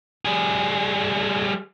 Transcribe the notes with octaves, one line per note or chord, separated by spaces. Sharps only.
G3 G#4